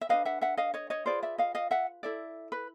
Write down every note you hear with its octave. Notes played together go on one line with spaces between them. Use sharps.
E5
D4 G4 B4 D#5 F5
E5 F#5
E5 F#5
D#5 F5
C#5 D#5
C#5 D#5
F4 G#4 B4 C5 D5
D5 E5
D#5 F5
D#5 F5
E5 F#5
E4 A4 D5 E5
B4